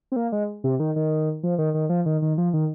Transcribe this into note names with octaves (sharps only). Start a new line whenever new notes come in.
C4
A#3
G#3
C3
D#3
D#3
F3
D#3
D#3
F3
D#3
D#3
F3
D#3